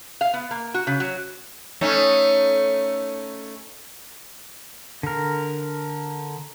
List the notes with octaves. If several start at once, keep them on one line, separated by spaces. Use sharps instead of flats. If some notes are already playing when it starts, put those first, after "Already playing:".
F5
B3
A#3
F#4
C#3
F#3
A3 C#4 D#4
D3 A#4